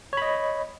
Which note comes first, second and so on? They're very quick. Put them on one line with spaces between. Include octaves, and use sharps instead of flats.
C#5 B5 D#5